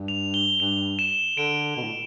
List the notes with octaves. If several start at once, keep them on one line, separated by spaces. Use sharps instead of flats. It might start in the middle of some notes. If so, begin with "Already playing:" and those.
Already playing: G2
F7
G7
G2 F7
E7
D3 D7
B2
A2